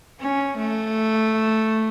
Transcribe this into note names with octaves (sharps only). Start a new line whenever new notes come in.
C#4
A3